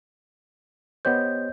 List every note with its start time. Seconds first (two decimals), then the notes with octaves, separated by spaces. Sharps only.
1.05 B3 G4 C5 C#5 D#5 G6